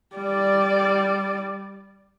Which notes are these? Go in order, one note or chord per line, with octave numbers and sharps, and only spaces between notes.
G3 D5